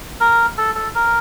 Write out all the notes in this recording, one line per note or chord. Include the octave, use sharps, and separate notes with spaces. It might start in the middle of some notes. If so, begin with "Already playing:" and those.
A#4
A4
A4
A#4